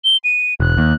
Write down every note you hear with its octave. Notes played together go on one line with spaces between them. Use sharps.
G7
D#7
E1 F#6
D#2